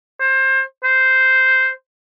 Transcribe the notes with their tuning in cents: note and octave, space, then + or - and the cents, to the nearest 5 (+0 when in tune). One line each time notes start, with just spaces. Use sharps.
C5 +25
C5 -5